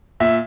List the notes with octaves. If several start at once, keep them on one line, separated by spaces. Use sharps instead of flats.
A#2 E5